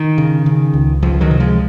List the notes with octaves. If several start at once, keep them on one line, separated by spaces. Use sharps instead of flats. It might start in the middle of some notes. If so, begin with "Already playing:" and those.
Already playing: D#3
C#3
C#3
C#2
C#2 F3
D#3 F#3
C3
F3 G#3